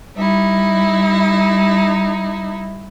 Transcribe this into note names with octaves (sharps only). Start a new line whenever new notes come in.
G3 D#4 E4